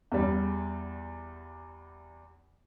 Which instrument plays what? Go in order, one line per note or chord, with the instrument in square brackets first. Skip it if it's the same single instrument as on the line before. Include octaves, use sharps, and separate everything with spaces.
[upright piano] E2 G3